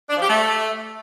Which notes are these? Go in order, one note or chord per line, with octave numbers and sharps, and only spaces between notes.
D4
F3
G4
A3